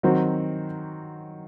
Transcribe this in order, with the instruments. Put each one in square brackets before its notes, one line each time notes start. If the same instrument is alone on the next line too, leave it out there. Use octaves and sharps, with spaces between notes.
[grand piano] D#3 F#3 C4 F#4